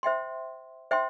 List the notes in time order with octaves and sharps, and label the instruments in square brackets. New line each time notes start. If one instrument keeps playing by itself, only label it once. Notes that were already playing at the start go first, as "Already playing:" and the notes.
[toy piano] C5 E5 G5 C6
C5 E5 G5 C6